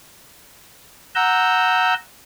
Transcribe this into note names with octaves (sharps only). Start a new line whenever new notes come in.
F#5 A#5 E6 G6